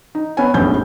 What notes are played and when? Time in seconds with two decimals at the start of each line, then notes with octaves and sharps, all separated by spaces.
0.15 D#4
0.37 B3 C#5 G#5
0.54 F1 A#1 F#2 B3 G6